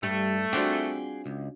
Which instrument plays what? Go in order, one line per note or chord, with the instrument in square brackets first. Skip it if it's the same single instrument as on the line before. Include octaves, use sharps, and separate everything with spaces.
[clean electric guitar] G2 [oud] G3 [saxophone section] A3
[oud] C4 F4 [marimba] D4 F#4 D5 [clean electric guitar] G#4 F#5 G5
[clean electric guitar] C#2